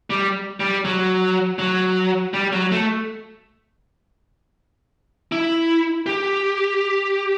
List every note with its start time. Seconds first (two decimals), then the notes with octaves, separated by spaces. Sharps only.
0.10 G3
0.60 G3
0.85 F#3
1.59 F#3
2.34 G3
2.53 F#3
2.72 A3
5.32 E4
6.06 G4